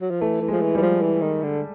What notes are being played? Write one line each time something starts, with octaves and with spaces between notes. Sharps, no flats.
F#3
F3
E3 A3
E3
F3 G#3
E3
E3 G3
F3
E3
D#3
D3